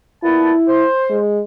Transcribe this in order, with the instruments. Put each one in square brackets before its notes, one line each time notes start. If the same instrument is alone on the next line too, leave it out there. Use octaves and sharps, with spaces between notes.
[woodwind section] A#2 B3 A5 [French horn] E4
[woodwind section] C5
[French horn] G#3